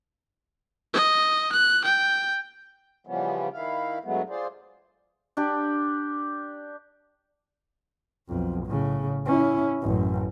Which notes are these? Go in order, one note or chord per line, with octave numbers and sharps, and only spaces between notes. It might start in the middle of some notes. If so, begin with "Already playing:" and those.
D#5
F#6
G5
C#3 E3 F3 G3 B3 C#4
D#3 E4 F5
G2 F#3 G#3 A3 B3
F4 G#4 C5 D5
D4 G4
B1 F2
A2 C#3
C#4 E4
A1 F#2